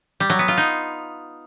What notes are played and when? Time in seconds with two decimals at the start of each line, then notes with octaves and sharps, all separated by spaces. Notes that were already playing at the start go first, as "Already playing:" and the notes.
0.20 G3
0.30 F#3
0.39 B3
0.48 F4
0.57 D#4